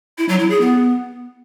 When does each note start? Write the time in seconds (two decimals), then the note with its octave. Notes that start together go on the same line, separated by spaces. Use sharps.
0.18 E4
0.29 F#3
0.39 E4
0.50 G#4
0.61 B3